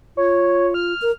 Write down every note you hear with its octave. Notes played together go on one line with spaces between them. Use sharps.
F4 C#5
F6
A#4